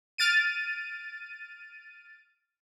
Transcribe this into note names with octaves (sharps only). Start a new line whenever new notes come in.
F6 A6 D7 D#7